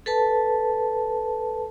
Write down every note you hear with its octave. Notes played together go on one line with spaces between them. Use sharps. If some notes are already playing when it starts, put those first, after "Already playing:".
A4 B4 A5